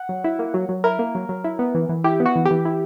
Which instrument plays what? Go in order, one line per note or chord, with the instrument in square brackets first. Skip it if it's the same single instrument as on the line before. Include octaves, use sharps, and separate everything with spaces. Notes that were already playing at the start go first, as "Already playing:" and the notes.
Already playing: [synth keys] F#5
F#3
E4
A#3
F#3
F#3
E4 A#4
A#3
F#3
F#3
E4
B3
E3
E3
E4 G4
B3
F#4
E3
G4
E3
E4